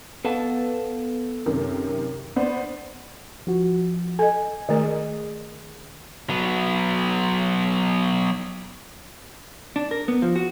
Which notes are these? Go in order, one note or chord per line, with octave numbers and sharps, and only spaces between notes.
B3 A4 F5 A5
F#2 C3 D#3
B3 D4 C5
F3 F#4
A4 D#5 G#5
D#3 A3 G#4 A#4 D#5
F#3 B3
D4
A#4
B3
F3
F#4